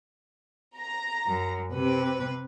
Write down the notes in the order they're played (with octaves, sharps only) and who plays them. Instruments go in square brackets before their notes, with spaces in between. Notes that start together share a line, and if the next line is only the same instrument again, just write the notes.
[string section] A#5
[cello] F#2
[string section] C3 [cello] B4